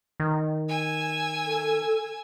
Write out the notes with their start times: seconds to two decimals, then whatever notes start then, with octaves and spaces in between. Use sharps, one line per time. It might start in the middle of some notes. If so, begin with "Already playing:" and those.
0.20 D#3
0.68 G#5 E6
1.46 A4